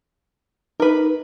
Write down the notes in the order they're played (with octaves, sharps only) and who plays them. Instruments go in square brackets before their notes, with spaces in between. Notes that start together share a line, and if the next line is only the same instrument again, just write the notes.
[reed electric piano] D#4 [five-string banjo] A#4 B4